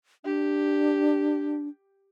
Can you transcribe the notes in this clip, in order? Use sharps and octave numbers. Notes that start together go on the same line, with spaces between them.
D4 G4